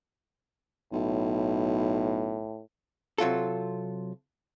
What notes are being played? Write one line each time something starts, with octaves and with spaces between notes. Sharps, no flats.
B1 A2
C3 F#3 F4 A4